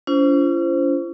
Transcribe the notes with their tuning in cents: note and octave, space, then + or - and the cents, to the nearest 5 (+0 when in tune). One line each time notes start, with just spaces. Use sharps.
C#4 +35 F4 -45 C5 +0